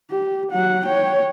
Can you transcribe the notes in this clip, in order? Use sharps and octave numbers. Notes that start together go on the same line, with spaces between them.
G4
F#3 F#5
C#5 G5